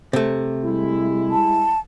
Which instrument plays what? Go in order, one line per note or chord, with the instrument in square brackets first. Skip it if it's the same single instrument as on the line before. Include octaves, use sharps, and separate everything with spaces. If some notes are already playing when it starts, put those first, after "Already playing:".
[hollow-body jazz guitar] C3 A3
[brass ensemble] G3 G#3 E4
[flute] A5